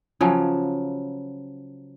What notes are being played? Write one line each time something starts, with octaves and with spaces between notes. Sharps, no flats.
C#3 F3 F#3